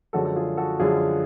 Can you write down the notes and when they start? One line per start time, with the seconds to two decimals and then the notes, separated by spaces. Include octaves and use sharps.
0.13 F#2 D3 F3 G#3 F#4 A4
0.25 A4
0.36 F4 G#4
0.57 F#4 A4
0.79 F#2 D3 F3 G#3 F4 G#4